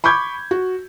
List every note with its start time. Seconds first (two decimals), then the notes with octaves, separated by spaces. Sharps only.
0.04 B5 C#6 D6 G6 G#6
0.51 F#4